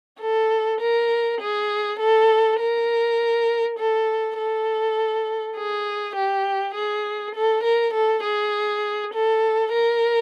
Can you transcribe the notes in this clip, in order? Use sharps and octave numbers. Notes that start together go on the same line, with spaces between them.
A4
A#4
G#4
A4
A#4
A4
A4
G#4
G4
G#4
A4
A#4
A4
G#4
A4
A#4